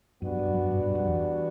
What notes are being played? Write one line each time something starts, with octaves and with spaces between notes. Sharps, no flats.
F#2 G3 B3 D4 F#4
F#2
F#2
G2
G2
F#2
E2